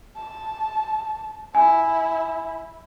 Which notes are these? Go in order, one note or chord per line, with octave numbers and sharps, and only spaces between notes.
A5
E4 G#5